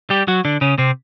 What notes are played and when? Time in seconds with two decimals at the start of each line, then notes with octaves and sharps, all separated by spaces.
0.10 G3 G4
0.28 F#3 F#4
0.45 D3 D4
0.61 C#3 C#4
0.78 C3 C4